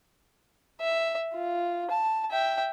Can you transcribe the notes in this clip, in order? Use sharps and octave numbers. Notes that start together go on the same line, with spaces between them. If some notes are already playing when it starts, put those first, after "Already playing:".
E5
F4
A5
E5 G5